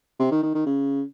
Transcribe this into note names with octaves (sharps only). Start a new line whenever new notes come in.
C3
D#3
D#3
D#3
C#3